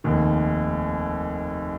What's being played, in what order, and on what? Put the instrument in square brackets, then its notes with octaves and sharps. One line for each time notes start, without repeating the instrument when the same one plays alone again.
[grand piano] F1 D#2 D#3